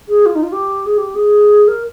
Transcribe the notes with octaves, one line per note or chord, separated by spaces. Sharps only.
G#4
F4
D#4
F4
G4
G#4
G4
G#4
A#4